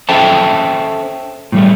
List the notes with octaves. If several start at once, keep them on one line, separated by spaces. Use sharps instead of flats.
C#4 A4 C5 E5 G5 A5
A2 G3 A3